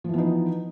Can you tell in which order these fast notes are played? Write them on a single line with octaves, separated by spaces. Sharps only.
F3 E3 B3 D#4